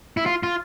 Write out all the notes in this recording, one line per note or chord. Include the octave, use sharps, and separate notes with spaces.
E4
F4
F4